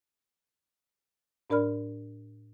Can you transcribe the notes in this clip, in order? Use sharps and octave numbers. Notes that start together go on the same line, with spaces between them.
A2 D4 A#4 D5 B5 F6